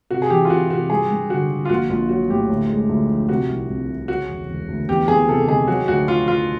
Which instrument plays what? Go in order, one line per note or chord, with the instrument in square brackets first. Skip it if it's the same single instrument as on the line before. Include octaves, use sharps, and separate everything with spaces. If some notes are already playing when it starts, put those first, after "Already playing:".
[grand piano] C3 [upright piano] F#4
[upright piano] G#4
[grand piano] E3 [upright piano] G4
[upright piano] F4
[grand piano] C3 [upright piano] F#4
[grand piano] C3 [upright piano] F#4
[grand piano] G2 [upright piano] G#4
[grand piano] G2
[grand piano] D3 [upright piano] F#4
[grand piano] D3
[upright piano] F4
[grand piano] A#1 [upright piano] F#4
[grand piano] A#1 [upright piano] F4
[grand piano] F#3 [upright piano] F#4
[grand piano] A2 [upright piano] G4
[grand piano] D2
G#3
D2
F3
[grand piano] C3 [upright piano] F#4
[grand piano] C2
C2
C3
[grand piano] C#3 [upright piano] F#4
[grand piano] E1
E1
D2
[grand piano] E2 [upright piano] G4
[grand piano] E2 [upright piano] G#4
[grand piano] C3 [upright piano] A4
[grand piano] D#3 [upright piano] G#4
[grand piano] F#3 [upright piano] F#4
[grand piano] D2 [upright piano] F#4
[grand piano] D2 [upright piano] F4
[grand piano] F#3 [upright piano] F4